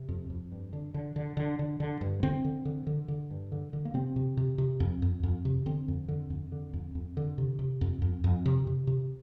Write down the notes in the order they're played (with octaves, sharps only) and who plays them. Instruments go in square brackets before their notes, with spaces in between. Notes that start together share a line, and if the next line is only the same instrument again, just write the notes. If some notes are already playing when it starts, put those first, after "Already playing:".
Already playing: [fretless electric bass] C3
F2
F2
G2
D3
D3
D3
D3
D3
D3
G2
D3 C4
D3
D3
D3
D3
G2
D3
D3
A#3
C3 C4
C3
C3
C3
F2
F2
F2
C3
D3 C4
F2
D3
F2
D3
F2
F2
D3
C3
C3
F2
F2
F2
C3
C3
C3